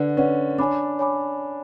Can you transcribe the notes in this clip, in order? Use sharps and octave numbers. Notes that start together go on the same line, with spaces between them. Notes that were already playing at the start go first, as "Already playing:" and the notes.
Already playing: D3 B4 D5 F#5
C#4 B4 D5 F#5
D4 C#5 G#5 B5 D6
C#5 G#5 B5 D6